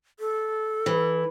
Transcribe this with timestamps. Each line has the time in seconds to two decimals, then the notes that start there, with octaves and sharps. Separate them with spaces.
0.20 A4
0.86 E3